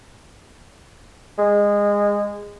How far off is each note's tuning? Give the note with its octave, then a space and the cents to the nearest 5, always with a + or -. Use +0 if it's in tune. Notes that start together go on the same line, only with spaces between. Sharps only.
G#3 -20